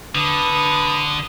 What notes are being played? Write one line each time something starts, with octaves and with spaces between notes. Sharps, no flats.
D3 B4 D#6